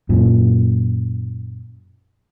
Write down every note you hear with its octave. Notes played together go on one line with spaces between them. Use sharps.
F#2 A#2